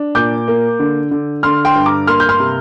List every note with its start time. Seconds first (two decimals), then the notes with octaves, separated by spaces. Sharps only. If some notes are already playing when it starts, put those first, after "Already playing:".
Already playing: D4
0.15 A#2 D6 G6
0.48 A#3
0.80 D3
1.11 D3
1.43 D3 C6 F6
1.65 G5 C6
1.75 G2
1.86 A#5 D6
2.07 A#3 C6 F6
2.20 G6
2.29 C6 F6
2.40 C3